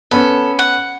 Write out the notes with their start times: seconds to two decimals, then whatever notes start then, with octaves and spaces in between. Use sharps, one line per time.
0.11 B3 C#4 A4
0.59 F#5